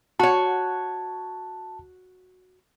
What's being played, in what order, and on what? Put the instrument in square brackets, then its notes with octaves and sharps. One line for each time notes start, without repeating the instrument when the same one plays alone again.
[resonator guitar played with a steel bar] F#4 C#5 [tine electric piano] A5